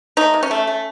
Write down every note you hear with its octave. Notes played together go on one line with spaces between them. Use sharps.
A3 D#4
C3
C#4
A3
A3